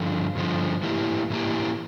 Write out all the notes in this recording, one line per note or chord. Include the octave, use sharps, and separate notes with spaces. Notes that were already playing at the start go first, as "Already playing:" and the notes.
Already playing: G2 D3 F3
G2 D3 F3
A2 E3 A#3 E4 G4
A2 E3 A#3 E4 G4